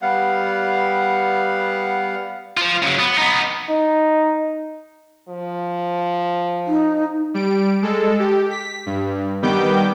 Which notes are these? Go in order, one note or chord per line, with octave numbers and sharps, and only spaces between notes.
G3 B3 F5 F#5
F4 C5
C#3 F#3
B3
B3 D#4
D#4
F3
D#4
G3 D7
G#3 A4
G4
B6
G2
D#3 G3 B3 G5 D6 G6